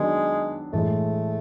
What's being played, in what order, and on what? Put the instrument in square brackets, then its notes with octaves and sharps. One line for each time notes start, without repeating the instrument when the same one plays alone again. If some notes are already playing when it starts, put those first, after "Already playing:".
Already playing: [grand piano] D#3 F#3 B3 D4 [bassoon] G#3
[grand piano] A2 E3 G#3 [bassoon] A3